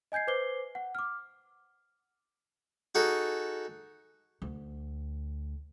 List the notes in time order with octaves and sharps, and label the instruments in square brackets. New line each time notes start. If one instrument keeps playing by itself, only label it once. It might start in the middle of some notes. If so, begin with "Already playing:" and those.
[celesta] D#5 G#5 G6 G#6 C7
B4 C5 D6 C7 G7
F#5
D6 F6
[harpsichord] D#4 F#4 G#4 A4
[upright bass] D2